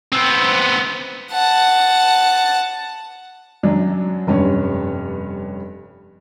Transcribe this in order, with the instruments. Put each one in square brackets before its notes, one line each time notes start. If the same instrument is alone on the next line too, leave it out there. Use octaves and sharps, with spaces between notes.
[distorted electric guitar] B3 C4
[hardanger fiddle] F#5 A5
[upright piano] F#2 F#3 D4
F1 G2 C#4